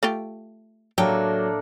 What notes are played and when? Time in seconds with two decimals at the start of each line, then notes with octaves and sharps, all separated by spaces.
0.03 A3 F4 G4
0.98 A2 F#3 A#3 D4 G4 A4